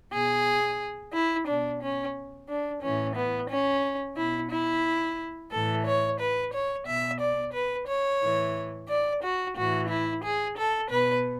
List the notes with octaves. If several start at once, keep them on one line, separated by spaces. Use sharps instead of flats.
B2 G#4
E4
B2 D4
C#4
D4
A2 E3 C#4
B3
C#4
B2 E4
E4
A2 E3 A4
C#5
B4
C#5
B2 E5
D5
B4
C#5
A2 E3
D5
F#4
A2 E3 F#4
E4
G#4
A4
B2 B4